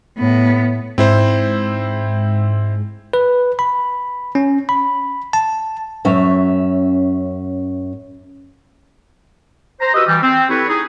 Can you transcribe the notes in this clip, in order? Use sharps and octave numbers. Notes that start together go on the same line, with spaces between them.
A2 B3
G#2 C4 E4 C5
B4
B5
C#4
B5
A5
F#2 C#4 E5
C5 A#5
F#4 G4 B4 D#5 D#6 E6
E3 G3
C4
E4 G4 A4 B4 C#5
D#4 G#4